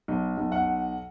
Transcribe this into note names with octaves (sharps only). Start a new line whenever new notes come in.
B1
B1
F#5